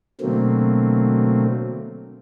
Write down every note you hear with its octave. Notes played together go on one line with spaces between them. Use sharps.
B2 D3 F#3 A3 A#3 C4